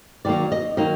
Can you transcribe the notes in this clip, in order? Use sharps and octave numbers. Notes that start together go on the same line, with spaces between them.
D#3 F#3 A#3 D5
D#5
D#3 F#3 A#3 D#5